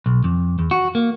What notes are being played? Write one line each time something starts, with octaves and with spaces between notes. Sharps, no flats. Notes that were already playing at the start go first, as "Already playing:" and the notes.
B1
F2
E2
F#4
A#3